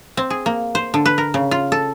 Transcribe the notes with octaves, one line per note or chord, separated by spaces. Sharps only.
C4
G#4
A#3
C5
D3
B4
A#4
C#3
F4
A4